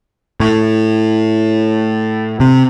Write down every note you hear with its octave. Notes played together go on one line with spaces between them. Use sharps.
A2
C3